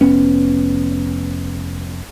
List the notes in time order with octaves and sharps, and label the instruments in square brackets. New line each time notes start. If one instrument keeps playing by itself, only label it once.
[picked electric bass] F1 B3 C#4